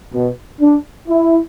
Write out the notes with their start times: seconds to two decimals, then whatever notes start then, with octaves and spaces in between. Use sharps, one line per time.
0.13 B2
0.61 D4
1.08 E4